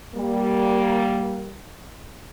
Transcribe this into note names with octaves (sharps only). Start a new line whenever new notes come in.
G3 A#3